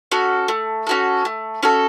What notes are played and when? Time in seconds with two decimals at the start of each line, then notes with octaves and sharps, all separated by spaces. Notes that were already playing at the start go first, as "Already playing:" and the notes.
0.12 C#4 F#4 A4
0.48 A3
0.87 C#4 F#4 A4
1.25 A3
1.63 C#4 F#4 A4